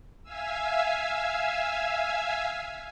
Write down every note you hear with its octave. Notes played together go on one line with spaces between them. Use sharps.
E5 F5 G#5 E6